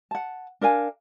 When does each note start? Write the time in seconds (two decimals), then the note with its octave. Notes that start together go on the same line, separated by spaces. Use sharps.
0.11 F#5 A5
0.61 D4 A#4 F5 G#5